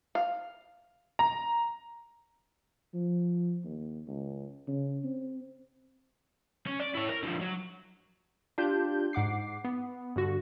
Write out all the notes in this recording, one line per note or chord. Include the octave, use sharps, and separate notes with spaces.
F5
A#5
F3
D#2
C#2
C#3
C4
C#4
D5
E4 C#5
A#4
D3 F3
F#3
D4 F4 G4 G6
G#2 F#5 D6 C7
B3
G2 D3 F#4